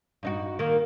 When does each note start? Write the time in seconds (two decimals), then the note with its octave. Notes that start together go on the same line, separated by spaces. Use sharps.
0.23 G2 D#4 F#4
0.59 D#3 A#3